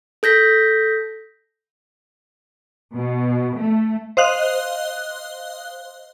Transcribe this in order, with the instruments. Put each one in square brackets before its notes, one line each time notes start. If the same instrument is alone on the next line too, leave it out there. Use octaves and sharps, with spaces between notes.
[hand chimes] A4 G6 A#6 B6
[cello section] B2
A3
[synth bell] C5 D#5 F5 F#6